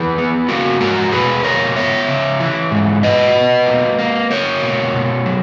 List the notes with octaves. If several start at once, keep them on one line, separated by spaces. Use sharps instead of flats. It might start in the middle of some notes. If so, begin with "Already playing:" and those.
Already playing: E3 G#4 B4
B3
A#3 F#4 A#4
G#2 F#4 A#4
B2 G#4 B4
A#3 A#4 C#5
B3 C#5 E5
C#3
E3
G#2
B2 B4 D#5
B2
A#3
A#3
A#3 A#4 C#5
B2
B2
F#3